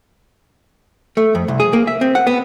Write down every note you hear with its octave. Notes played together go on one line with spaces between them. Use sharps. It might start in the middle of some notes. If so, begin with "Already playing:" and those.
A3
F2
C2
G#4
A#3
E5
C4
F#5
B3